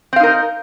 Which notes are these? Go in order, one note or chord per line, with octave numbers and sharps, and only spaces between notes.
C4 D#4 A#4 F5